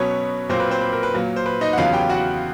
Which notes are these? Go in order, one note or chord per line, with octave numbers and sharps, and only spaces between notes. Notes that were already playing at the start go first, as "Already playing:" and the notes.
Already playing: B2 F#3 B3 C#4 C#5
A#2 F#3 A#3 C4 C5
B4
C4 C5
B4
A#4
B4
A#2 F#3 A#3
C5
B4
D#4 D#5
F#5
E2 C#3 F#3 B3 F4 F5
G4 G5
F#4 F#5